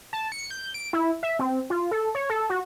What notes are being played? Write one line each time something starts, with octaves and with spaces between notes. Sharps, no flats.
A5
C#7
G6
D7
E4
E5
C4
F4
A4
C#5
A4
F#4